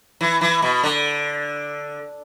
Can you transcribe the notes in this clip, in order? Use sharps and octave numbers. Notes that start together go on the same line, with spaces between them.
E3
E3
B2
D3